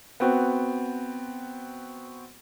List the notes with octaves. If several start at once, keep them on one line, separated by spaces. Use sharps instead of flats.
B3 C4 F#4